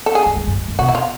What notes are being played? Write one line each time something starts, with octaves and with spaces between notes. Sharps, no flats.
A4
G#4
F#2
G2
F#2
F#2
B2 F#4
E4
F4